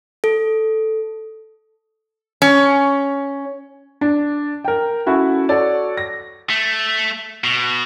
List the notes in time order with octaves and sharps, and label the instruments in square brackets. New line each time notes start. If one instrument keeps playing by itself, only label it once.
[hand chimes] A4
[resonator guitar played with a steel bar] C#4
[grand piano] D4
A#4 G5
C#4 E4 F#4 A4
F#4 A4 C#5 D5
A#6
[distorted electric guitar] A3
B2